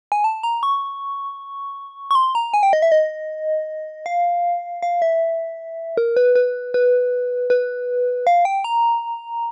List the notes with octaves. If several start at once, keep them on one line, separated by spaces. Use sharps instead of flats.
G#5
A5
A#5
C#6
C#6
C6
A#5
G#5
G5
D#5
E5
D#5
F5
F5
E5
A#4
B4
B4
B4
B4
F5
G5
A#5